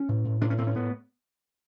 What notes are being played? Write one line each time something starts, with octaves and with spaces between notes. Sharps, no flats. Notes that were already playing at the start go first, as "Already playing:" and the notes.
Already playing: C#4
A2
A2
A2 D4
C#4
A2 C4
C#4
A2 B3